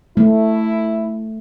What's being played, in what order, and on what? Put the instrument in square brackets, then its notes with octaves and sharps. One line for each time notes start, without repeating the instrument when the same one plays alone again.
[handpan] A3 [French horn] E4